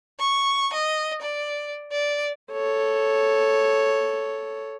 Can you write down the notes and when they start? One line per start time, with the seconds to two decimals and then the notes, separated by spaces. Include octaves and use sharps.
0.19 C#6
0.73 D#5
1.22 D5
1.91 D5
2.52 A4 C#5